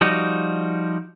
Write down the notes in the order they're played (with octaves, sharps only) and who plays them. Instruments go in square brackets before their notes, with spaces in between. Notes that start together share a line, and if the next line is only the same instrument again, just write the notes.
[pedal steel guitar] F3 G3 D#4 F#4